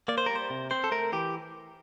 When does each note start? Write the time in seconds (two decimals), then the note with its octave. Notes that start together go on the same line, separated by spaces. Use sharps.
0.08 A#3 D5
0.18 C5
0.26 G3 A#4
0.35 C5
0.50 C3
0.71 C4 C5
0.84 A4
0.91 A3 A#4
1.13 E3 G4